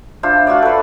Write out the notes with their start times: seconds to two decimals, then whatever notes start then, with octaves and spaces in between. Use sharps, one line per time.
0.23 D4 F4 C5 E5
0.47 F4 F#4 C#5 D5
0.62 A4 B4